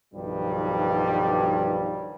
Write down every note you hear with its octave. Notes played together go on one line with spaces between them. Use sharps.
B1 G2 D#3 F3 G3